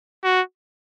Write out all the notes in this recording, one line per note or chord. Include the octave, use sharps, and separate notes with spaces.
F#4